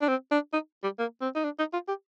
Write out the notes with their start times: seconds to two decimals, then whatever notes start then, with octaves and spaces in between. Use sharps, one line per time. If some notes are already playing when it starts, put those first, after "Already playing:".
0.02 D4
0.08 C4
0.31 D4
0.53 D#4
0.83 G3
0.99 A#3
1.21 C4
1.35 D#4
1.44 D4
1.59 D#4
1.73 F4
1.88 G4